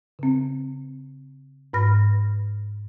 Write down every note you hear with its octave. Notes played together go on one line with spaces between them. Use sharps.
C#3 C4
G#2 B4 B5 F6 A#6